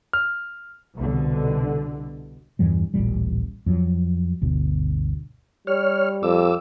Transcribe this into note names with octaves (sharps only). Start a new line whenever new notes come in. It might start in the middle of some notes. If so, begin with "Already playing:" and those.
F6
C2 B2 D3
E2 G2 E3 G3
D1 A1 A#2 G3
F2 F#3
G1 D2 B2
G3 C#5 F6
F2 D6 E6